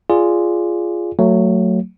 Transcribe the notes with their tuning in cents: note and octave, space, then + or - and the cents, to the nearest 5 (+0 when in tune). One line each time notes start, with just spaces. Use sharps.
F4 -10 G#4 +0 D5 +0
F#3 +0 A3 +25